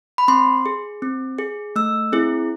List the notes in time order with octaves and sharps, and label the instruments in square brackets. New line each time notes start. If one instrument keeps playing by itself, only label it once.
[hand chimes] B5
C4 C6
G#4
C4
G#4
A3 E6
C4 E4 G#4